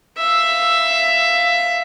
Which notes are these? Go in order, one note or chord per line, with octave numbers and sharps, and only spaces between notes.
E5 F5